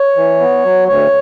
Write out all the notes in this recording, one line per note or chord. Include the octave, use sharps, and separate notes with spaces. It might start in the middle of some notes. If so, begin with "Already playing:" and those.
Already playing: C#5
E3
B3
F#3
D2 C#5